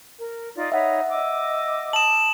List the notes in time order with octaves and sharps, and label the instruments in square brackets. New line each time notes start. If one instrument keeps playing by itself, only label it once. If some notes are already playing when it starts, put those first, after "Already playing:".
[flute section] A#4
D#4 F4 D5
[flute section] D#4 C#5 B5 [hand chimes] E5 F#5
[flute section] D#5 D6 E6
[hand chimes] A5 D#6 [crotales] E7 F#7